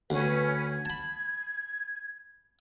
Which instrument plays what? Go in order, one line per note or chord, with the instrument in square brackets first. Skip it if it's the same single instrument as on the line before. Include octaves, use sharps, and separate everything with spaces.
[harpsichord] D2 [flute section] C#4 B4
[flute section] G#6
[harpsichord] A5 B5